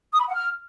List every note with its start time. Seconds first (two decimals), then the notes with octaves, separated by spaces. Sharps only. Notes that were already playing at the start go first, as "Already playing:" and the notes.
0.13 D#6
0.20 B5
0.27 F#5
0.33 F6